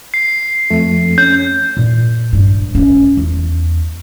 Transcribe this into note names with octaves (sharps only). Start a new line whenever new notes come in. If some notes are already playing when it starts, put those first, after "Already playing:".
C7
F2 A3
C#4 G6
A#2
G2
C#4
E2